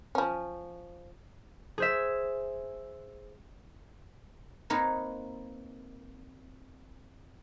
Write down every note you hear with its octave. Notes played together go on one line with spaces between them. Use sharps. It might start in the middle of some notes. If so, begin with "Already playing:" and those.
F3 C#4
G#4 C5 E5
A#3 C4 D#4 A#4 B4 C#5